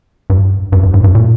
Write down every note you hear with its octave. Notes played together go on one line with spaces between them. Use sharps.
G2
G2
G2
G#2
G2
A#2